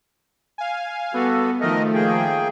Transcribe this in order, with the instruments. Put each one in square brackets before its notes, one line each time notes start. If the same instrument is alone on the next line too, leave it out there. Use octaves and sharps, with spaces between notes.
[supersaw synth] F5 G#5
[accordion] G3 F#4 A4 [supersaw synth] B3
[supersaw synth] D#3 F3 A3 [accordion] A#4 D#5
[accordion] A#3 G#4 G5